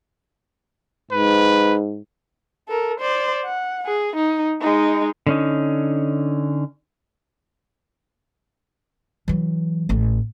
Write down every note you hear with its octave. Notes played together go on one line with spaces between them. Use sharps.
G#2 B4
A4 A#4
C5 D5
F#5
G#4
D#4
G#3 D#4
D3 C#4 D#4
E3 F#3
A1 A2